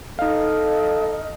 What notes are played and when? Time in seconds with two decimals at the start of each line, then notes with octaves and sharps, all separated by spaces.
0.19 D#4 A4 D#5 F5